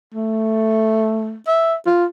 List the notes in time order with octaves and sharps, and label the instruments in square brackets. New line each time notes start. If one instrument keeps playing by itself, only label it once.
[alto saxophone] A3
E5
F4